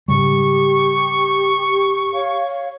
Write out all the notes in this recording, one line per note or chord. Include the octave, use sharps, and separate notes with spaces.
G#2 C#3 G3 G4 C#6
C#5 F5